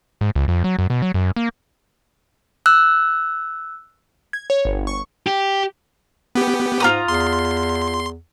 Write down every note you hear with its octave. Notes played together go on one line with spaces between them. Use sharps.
G#2
C#2
F2
F#3
F#2
B2
F#3
F#2
A#3
E6 F#6
G#6
C#5
G1
C#6
G4
B3 G4
G#2 F4 A#5 D#6
E2 C6